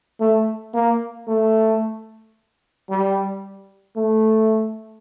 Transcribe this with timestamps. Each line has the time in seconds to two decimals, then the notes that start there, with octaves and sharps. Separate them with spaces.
0.20 A3
0.74 A#3
1.28 A3
2.89 G3
3.96 A3